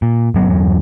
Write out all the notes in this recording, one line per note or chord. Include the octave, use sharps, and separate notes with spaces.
A#2
G1 F#3 B3
G1 E2 F#3